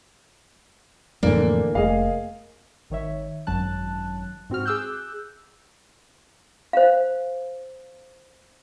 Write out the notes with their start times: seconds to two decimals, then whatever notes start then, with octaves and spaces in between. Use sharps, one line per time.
1.23 F2 A2 D3 E3 A#3 D4
1.75 F1 A3 G#4 D#5 F5
2.90 G#1 D#3 C#5 E5
3.47 G#1 F#2 F#3 A5 F#6
4.50 G#2 C4 F#4 F6
4.66 G#4 D6 E6 F#6 G6
6.73 C5 F5